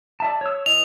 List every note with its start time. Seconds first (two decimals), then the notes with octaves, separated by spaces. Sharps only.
0.20 D5 E5 A5
0.41 C#5 E6
0.66 E3 D#5 F7